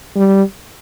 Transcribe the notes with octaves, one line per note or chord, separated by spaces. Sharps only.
G3